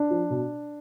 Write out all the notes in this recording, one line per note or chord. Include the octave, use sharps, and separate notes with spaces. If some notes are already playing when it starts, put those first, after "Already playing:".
Already playing: D4
F3
B2